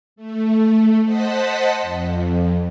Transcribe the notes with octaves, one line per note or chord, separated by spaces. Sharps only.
A3
C5 D#5 F#5 A5 B6
F2